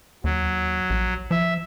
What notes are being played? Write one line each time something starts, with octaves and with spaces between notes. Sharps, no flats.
D#2 F#3
A#1
F3 E5